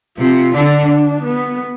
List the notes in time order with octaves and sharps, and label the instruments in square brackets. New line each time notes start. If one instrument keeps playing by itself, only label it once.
[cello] C3 [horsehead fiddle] F4
[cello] D3 [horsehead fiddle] D4
[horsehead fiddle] B3